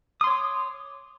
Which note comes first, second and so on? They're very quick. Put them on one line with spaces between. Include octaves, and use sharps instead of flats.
D#6 C6 C#5 D6